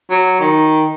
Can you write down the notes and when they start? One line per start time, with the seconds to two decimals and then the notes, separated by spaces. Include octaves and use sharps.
0.10 F#3
0.40 D#3